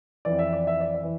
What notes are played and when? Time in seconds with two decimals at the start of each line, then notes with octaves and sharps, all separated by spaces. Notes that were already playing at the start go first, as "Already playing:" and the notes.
0.25 F2 E3 D5
0.39 E5
0.53 D5
0.67 E5
0.80 D5
0.95 E5
1.03 E3